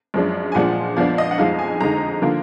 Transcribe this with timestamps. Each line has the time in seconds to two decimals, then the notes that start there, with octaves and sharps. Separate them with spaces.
0.14 F#2 F3 G#3 D4
0.52 G#5
0.55 A#2 F3 G#3 D4 F#5
0.96 F2 F3 B3 D4 F5
1.18 D#5
1.31 F#5
1.38 F2 F3 G#3 D#4 F5
1.59 G#5
1.81 F2 D3 G#3 D#4 A#5
2.22 D3 F3 A#3 F4